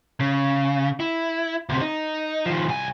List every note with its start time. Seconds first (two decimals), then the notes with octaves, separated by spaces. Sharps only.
0.20 C#3
1.00 E4
1.69 D2 C3
1.81 D#4
2.46 D#3 F3
2.68 C2 G#5